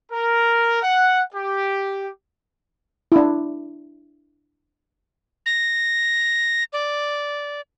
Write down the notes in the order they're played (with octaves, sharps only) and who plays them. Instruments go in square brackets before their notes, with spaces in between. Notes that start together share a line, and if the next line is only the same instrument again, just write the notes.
[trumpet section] A#4
F#5
G4
[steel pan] D4 E4
[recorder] A#6
D5